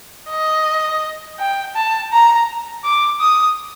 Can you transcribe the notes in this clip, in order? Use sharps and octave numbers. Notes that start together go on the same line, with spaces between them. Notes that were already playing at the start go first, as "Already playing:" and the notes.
D#5
G5
A5
A#5
D6
D#6